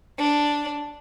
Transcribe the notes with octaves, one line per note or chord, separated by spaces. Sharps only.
D4